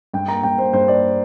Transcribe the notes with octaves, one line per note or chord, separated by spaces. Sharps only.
G2 G5
A#3 A#5
G2 G5
A#3 C5
G2 C5
A#3 D5